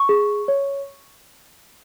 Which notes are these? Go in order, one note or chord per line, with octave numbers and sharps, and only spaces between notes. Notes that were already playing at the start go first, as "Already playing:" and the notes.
Already playing: C#6
G#4
C#5